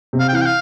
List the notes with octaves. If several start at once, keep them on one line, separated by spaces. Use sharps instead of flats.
C3
F5
G5
E3 F5
G5
F5